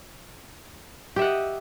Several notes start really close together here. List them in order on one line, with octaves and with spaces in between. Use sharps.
G4 E5 F#5 D#5